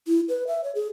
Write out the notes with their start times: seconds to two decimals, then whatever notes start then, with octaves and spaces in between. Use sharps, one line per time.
0.07 E4
0.29 B4
0.47 E5
0.64 C#5
0.75 G#4